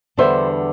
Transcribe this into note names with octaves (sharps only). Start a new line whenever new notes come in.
E2 D3 G3 B3 D4 C5 E5